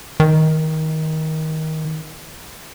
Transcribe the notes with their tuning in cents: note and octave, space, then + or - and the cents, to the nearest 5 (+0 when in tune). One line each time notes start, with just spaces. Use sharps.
D#3 +20